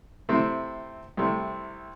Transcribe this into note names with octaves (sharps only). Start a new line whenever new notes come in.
C3 A3 C4 E4
C2 C3 A3